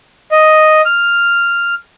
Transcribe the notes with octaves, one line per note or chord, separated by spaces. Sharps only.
D#5
F6